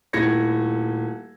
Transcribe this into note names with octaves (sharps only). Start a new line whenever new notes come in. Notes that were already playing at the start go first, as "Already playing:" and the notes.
D#1 A3 E4 G#6 A#6 C#7